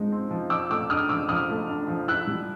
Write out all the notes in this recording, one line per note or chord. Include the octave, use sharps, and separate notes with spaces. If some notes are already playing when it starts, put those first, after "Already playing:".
Already playing: F3 G#3 C4 D#4
C4
F3
F3 D6 E6
A3 D6 E6
D4 D#6 F6
F3 D6 E6
F3 D#6 F6
A3
D4
F3
E4 E6 F#6
G3